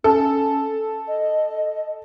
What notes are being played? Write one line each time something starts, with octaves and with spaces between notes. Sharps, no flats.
C#4 A4
D#5